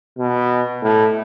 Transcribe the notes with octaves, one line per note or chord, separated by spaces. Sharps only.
B2
A2